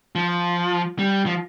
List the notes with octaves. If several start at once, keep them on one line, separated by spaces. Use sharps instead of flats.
F3
G3
F3